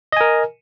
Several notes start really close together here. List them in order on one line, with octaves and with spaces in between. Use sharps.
D#5 G#5 A#4